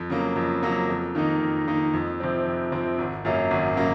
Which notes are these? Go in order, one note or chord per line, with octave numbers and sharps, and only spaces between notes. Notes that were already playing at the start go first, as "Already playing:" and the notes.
Already playing: F2
C#3 F#3 A#3
F2
C#3 F#3 A#3
F2
D#3 A#3 D#4
F2
D#3 A#3 D#4
F2
C3 F3 C4
F2
C3 F3 C4
G#1
F#2 C#3 F#3 A#3
G#1
C#3 F#3 A#3